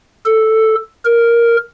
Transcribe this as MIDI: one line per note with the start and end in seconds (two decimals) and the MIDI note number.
0.26 0.75 69
1.05 1.56 70